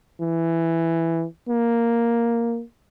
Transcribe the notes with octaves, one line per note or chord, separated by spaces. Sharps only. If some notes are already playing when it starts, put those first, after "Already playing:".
E3
A#3